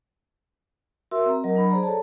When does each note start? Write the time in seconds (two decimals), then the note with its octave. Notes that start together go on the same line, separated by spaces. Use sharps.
1.11 F#4 A#4 E5 C6 E6
1.26 C4 A#5
1.44 F#3 A#4 D#5
1.55 F#3 D4 B5
1.70 G#4 C5 D5 A#5
1.83 A4 C#5 A5